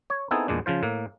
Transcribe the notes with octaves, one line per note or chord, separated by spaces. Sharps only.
C#5
B3 C4 D#4 E4 G#4 A4
E2 A#2 G#3 D4
C#3 F3 F4 C5
A2 A#3